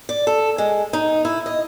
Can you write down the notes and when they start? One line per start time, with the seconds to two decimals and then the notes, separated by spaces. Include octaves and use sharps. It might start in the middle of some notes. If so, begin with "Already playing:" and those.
0.09 D5
0.27 A4
0.58 G#3
0.93 D#4
1.25 E4
1.46 D#5